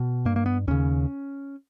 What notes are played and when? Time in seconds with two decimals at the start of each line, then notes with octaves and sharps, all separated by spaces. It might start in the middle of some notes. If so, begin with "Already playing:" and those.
Already playing: B2
0.25 G2 A#3
0.36 A#3
0.46 B3
0.68 D#2 C#3 C#4